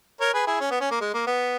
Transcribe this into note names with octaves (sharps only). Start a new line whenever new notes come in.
A#4 C#5
G#4 B4
E4 G#4
C#4
B3
C#4
A#3
G#3
A#3
B3